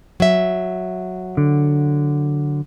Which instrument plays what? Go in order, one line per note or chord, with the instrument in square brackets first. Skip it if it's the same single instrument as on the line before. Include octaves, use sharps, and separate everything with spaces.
[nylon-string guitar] F#3 E5
[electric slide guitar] D3